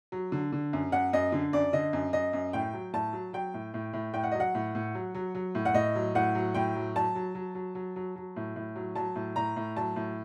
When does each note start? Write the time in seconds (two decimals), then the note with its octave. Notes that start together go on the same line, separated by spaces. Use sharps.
0.12 F#3
0.32 D3
0.52 D3
0.73 F#2
0.92 F#2 F#5
1.13 F#2 D#5
1.32 D3
1.53 F#2 D5
1.73 D3 D#5
1.93 F#2
2.13 F#2 D#5
2.33 F#2
2.53 A2 G5
2.73 F#3
2.93 A2 A5
3.13 F#3
3.33 F#3 G5
3.54 A2
3.74 A2
3.93 A2
4.13 A2 G5
4.23 F#5
4.32 F#3 D#5
4.40 F#5
4.55 A2
4.75 A2
4.95 F#3
5.15 F#3
5.35 F#3
5.55 A2
5.65 F#5
5.74 A2 D#5
5.95 F#3
6.15 A2 F#5
6.35 F#3
6.54 A2 G5
6.75 F#3
6.95 F#3 A5
7.15 F#3
7.35 F#3
7.55 F#3
7.75 F#3
7.96 F#3
8.16 F#3
8.36 A2
8.56 A2
8.76 F#3
8.96 F#3 A5
9.16 A2
9.36 A2 A#5
9.56 A2
9.77 F#3 A5
9.96 A2